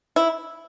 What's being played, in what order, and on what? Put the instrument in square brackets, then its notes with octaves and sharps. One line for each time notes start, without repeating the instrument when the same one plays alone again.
[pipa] E4